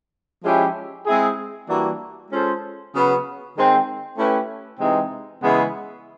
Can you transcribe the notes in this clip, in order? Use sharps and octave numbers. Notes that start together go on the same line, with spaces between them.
F3 G#3 C#4 E4 G4
G#3 C4 E4 G#4
E3 G3 A#3 D4 F#4
G#3 C#4 F4 A4 C5
C#3 F#3 B3
D#3 G#3 C4
A3 C#4 E4 G4 B4
C3 E3 G#3 C4 D#4
C#3 E3 G#3 B3